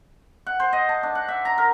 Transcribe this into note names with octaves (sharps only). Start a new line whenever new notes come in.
F#5
C5
D#5
A5
D4
F#5
E5
A#5
A#4